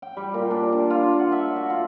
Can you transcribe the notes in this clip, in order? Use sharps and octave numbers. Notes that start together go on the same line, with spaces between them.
G5
G3
A#2
D4
A5
F4
F#5
E5
F#4
F4